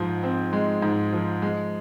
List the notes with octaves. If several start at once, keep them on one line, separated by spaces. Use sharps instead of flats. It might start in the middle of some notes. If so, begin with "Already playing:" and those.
Already playing: G#2 F3
C4
G#3
G#2
F3
G#3